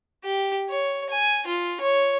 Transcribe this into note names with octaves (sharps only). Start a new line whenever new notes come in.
G4
C#5
G#5
F4
C#5